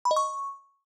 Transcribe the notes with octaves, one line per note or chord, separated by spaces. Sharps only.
B5
D#5
C#6